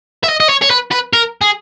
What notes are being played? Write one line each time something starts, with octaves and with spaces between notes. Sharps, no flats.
E5
D#5
D#5
C#5
C#5
B4
B4
A#4
G#4